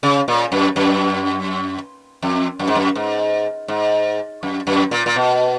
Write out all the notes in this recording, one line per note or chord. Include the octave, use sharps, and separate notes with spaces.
C#3
A#2
F#2
F#2
F2
F#2
G#2
F#2
G#2
G#2
F#2
F#2
A#2
A#2
B2